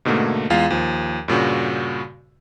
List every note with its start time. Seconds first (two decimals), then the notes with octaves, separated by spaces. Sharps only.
0.05 G#2 B2 D3 A3 A#3
0.50 E2 G#3 F4 F5
0.70 D#2 F3
1.28 G2 A#2 C#3 F#4